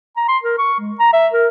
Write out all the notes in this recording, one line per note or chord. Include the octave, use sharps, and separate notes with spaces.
A#5
C6
A#4
C#6
G#3
A#5
E5
A#4